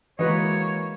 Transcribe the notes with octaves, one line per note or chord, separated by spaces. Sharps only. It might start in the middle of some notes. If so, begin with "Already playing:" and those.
E3 G#3 A#3 F#4 B4 C#5 D#5